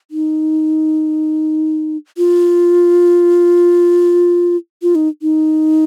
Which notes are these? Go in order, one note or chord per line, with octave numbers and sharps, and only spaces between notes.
D#4
F4
F4
D#4
D#4